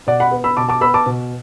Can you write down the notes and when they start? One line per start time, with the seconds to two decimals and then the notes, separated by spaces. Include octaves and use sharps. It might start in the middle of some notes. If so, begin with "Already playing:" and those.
0.07 B2 D5 F#5
0.20 F#5 B5
0.31 B3
0.44 B5 E6
0.57 B2 A5 D6
0.69 A5 D6
0.81 B3 B5 E6
0.94 A5 D6
1.06 B2